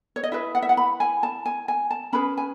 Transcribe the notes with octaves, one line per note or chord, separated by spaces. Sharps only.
C#5
D#5
E4 G#4 B4 E5
F#5
E5
F#5
B5
G#5
A5
G#5
G#5
A5
C#4 G#4 B4 B5
G#5